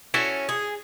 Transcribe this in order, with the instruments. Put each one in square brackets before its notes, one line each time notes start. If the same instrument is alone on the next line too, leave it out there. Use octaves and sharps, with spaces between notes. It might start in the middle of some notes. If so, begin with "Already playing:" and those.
[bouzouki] C#4 [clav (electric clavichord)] E4 F#4 A4
[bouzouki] G#4